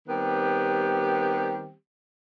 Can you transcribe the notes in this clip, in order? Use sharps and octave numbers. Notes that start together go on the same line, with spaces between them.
D#3 G3 B3 C4 G4